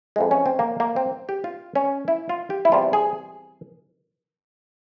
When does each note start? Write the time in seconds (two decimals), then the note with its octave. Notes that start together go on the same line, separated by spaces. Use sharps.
0.16 F2 E3 G#3
0.31 C#4
0.46 C4
0.59 A#3
0.80 A#3
0.96 C4
1.29 G4
1.44 F4
1.75 C#4
2.08 E4
2.29 F4
2.50 G4
2.65 E4
2.72 E2 C3 G3 F4
2.93 G#4